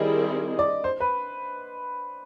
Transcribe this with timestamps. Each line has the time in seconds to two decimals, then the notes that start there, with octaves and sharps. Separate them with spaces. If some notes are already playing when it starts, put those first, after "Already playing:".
Already playing: D#3 G3 C4 E4 G#4 D#5
0.59 D5
0.84 C5
1.00 B4